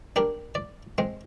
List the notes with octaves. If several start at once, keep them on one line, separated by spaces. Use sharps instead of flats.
D4 G4 A#4
D5
G#3 C4